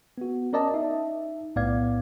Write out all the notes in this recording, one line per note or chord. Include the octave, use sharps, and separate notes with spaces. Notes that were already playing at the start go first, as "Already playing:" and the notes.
B3 F#4
C#4 A#4 D5 D#5 A5
D#4 E5
B1 A2 B3 D5 F5 G#6